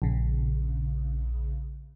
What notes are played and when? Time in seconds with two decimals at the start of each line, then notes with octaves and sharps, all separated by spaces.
0.02 A#1 C#3